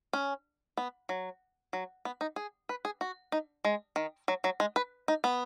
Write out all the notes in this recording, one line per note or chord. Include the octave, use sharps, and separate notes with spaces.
C#4
B3
F#3
F#3
B3
D#4
G#4
B4
G#4
F#4
D#4
G#3
D#3
F#3
F#3
G#3
B4
D#4
B3